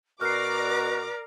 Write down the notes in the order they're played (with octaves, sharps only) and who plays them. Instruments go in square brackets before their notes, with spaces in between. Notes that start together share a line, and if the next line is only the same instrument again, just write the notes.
[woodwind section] B2 F#4 [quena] A#4 [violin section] D5 A#5 D6 [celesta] F6 C7